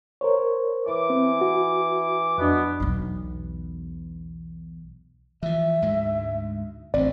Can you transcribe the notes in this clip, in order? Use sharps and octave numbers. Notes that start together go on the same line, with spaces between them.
A#4 C5 C#5
E3 D6
C4
F#4
F2 B2 B3 D4
B1 E2
E3 F3 E5
D2 G#2 G#3
A1 D2 G2 C4 D5